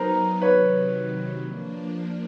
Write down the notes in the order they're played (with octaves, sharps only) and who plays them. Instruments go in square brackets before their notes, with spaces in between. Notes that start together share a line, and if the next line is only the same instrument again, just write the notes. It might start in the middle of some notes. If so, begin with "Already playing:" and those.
Already playing: [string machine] F#3 B3 D#4 [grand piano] A#4 C5
[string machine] C3 D#3 F#3 [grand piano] B4 C#5
[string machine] F3 A#3 D4